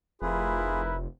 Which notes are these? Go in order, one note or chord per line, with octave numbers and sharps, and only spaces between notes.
F1 E4 F4 G#4 A#4 B4